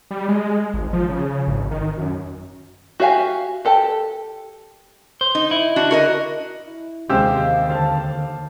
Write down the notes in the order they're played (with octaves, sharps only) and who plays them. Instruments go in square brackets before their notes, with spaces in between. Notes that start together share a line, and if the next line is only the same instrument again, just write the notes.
[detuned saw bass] G3
G#3
G#1
F3
C#3
G#1
D#3
F#2
[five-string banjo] F#4 G4 E5 F5 G#5
G4 A4 G5 A5
[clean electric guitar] C5
[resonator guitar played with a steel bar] D#4
[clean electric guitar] E4
[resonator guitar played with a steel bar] D4 F#4
F#4 A#4 D#5
[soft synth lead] E4
[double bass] D#2 [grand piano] C3 G#3 C5 [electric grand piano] G4 G5 E6 [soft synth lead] F5
[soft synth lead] D3 [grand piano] C5 F5 A5